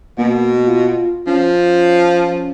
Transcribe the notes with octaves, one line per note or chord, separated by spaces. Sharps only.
B2 A#3
F4
F3 C#4